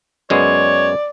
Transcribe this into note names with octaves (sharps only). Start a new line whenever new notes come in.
F#2 G#3 B3 C#5 D5